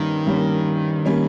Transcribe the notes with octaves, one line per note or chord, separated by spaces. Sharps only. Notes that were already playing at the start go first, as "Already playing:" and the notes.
Already playing: G2 D#3 G3 A#3 C#4
G2 G3 A#3 C#4
G3 A#3 C#4